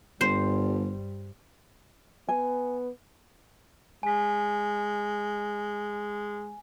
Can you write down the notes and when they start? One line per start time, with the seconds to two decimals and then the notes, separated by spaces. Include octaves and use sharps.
0.21 G1 G2 G3 C5
2.29 B3 G#5
4.03 G#3 G#5 B6